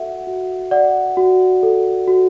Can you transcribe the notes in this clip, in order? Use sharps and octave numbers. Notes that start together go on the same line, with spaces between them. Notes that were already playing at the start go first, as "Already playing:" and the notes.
Already playing: F#4 A4 E5 F#5
F#4
D5 F#5
F#4
A4
F#4